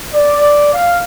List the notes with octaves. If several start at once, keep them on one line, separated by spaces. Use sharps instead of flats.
D5
F5